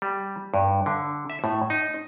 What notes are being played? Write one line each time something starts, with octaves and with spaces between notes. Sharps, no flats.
G3
G2
D3
E5
A2
D#4